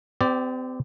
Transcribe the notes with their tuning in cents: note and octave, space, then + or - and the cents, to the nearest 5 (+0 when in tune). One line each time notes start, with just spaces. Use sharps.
C4 -40 G4 +0 D5 +0